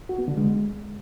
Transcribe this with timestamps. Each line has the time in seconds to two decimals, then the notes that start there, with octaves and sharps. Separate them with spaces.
0.09 F#4
0.19 B3
0.28 D3
0.37 G#3